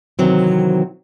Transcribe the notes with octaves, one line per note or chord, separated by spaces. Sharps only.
C3 D#3 E3 F#3 C4